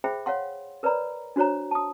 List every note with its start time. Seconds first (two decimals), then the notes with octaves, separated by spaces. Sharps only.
0.04 G#4 C5 E5 G5 B5
0.26 C#5 F5 F#5 C6
0.83 A#4 B4 C#5 D5 A#5 B5
1.36 D4 F#4 C5 C#5 A#5
1.71 A5 D#6